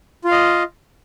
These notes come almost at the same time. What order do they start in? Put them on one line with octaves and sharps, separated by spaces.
F4 F5 D#5